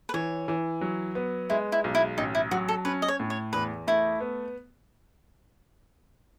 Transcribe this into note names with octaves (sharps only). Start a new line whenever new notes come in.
B4
E3 C#5
E3
F#3
B3
G#3 E4
E4
B1
E4
A1 D#4
E4
F#3 F#4
A4
C#4 B4
D#5
C#5
A2
C#5
E2 B4
A3 E4
B3